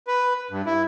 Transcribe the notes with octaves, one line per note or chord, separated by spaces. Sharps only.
B4
G2
E4